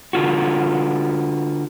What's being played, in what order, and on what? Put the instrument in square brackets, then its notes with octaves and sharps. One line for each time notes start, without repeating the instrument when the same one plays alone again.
[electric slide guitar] D3 F4 F#4